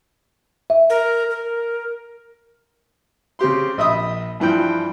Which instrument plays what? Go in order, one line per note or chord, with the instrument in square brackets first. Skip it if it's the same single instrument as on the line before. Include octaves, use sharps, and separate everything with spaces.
[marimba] E5
[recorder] A#4
A#4
[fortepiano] C#3 C4 G4 C6
A#1 D#5 E5 B5 D#6
G2 E3 F3 G5